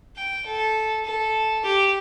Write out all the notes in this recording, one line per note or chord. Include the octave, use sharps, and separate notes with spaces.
G5
A4
A4
G4